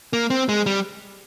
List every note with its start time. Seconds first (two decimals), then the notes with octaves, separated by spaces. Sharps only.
0.13 A#3
0.30 C4
0.49 G#3
0.66 G3